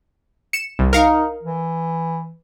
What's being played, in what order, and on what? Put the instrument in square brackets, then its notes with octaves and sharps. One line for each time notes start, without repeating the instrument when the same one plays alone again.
[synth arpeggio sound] C#7 E7
C2
[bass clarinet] D#4 [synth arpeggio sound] A#4 F5 C#7
[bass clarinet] E3